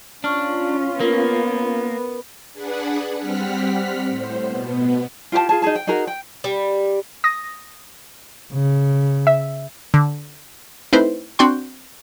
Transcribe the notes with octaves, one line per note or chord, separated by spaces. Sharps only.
C#4 D4 F4 C#6 F6
A#3 B3 A#4
D4 G#4 B4 F#5
G3 C4 F#5 F6 B6
A2 C5
B2 B3
F4 G4 F5 A5
F4 G#4 A5
D#4 F#4 G#4 A5
G5
D#4 F#4 G#4 A#4
G5
G3
D#6 A#6
C#3
E5
D3
A3 C4 D#4 E4 B4 C5
C4 D4 F#4 D5 G5 C6